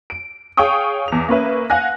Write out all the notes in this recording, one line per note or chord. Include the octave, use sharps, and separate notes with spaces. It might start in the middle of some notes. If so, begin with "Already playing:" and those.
D7
G#4 C#5 F5 G5 C#6 D#6
E2 F7
A#3 C#4 B4 E5
F5 F#5 G#5 F#6 A#6